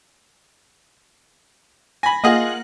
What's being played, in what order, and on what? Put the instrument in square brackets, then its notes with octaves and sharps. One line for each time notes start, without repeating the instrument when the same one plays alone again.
[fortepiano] G#5 B5 [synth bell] A#6
[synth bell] A#3 F#5 F#7 [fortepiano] F4 G#4 D#5